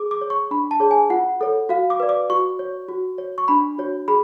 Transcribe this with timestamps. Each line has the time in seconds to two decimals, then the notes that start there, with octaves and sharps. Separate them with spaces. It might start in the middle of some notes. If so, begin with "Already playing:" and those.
Already playing: G#4 D6
0.11 D6
0.21 C#5
0.30 C#6
0.51 D4 B5
0.71 A5
0.80 G#4 C#5
0.91 G#5
1.10 F4 F#5
1.41 A4 C#5
1.69 F#4 F5
1.90 D6
2.00 B4 D5
2.09 D6
2.29 F#4 C#6
2.59 C#5
2.89 F#4
3.18 C#5
3.38 C#6
3.48 D4 B5
3.78 F#4 C#5
4.08 G#4 B5